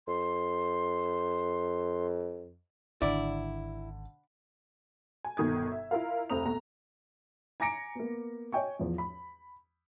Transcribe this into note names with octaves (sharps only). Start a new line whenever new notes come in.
F2 C6
G#1 D3 E4 D5
G#5
G1 B2 D#3 D#6 G#6
E5
E4 F4 A#4 F5
F1 D2 C4 A#5 D#6 F7
B2 A3 A#5
G#5 A#5 D6 A#6 C#7 D7
A#3 B3
C#5 D#5 G5 G#5 C#6
E2 F3
B5